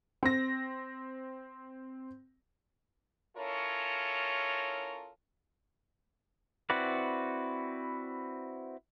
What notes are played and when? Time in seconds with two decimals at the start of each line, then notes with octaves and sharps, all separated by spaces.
0.23 C4 A#6
3.37 C#4 E4 F4 A4 A#4 C#5
6.70 C4 E4 F#4 B4 D5